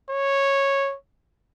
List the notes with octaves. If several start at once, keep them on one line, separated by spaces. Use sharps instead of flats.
C#5